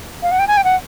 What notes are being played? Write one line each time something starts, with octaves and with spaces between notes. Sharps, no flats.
F5
F#5
G5
G#5
G5
F#5